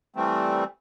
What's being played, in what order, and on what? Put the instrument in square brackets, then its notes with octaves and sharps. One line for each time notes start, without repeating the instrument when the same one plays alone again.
[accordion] E3 G3 A3 C4